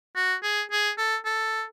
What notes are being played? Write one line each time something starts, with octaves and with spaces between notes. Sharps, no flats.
F#4
G#4
G#4
A4
A4